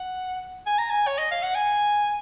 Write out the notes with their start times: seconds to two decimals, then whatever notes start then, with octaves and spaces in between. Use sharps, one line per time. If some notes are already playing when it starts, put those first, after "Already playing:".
Already playing: F#5
0.67 G#5
0.78 A#5
0.90 G#5
1.07 C#5
1.18 D#5
1.31 F5
1.43 F#5
1.55 G#5